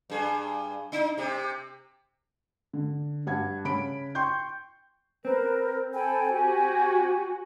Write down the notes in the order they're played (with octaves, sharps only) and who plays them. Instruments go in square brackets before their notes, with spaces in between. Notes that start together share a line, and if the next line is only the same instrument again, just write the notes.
[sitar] G2 G#4
D4 D#4
C3 G4
[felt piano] D3
G2 F#5 G#6
C#3 B5 D7
G5 C6 C#6 G6
[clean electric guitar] C4 [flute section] A#4 B4
[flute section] A4 G5 B5 [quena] G#5
[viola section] F#4 [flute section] G4